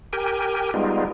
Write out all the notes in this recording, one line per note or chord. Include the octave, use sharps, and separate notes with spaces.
G4 A#4 G5 G#5
G3 G#3 B3 D#4 F4